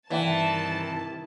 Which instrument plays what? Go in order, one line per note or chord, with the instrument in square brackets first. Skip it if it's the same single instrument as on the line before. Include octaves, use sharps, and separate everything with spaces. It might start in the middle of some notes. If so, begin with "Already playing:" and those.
[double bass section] G2 C3 D#3 [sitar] E3 [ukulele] D5 E5 G5 [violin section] A5